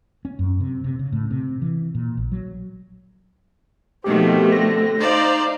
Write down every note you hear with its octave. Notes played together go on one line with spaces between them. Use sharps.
C#4
F#2
C3
C3
C#3
A2
C3
E3
A#2
A#1
F#3
B2 D#3 F3 A3 C4 G4
D3 A#6
D#4 C5 D5 F5